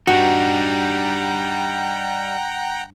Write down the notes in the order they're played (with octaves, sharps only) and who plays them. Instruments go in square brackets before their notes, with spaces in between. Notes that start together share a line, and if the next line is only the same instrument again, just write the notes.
[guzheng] G2 [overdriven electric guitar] G3 D#4 [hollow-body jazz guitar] F#4 [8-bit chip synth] F#5 G5 A#5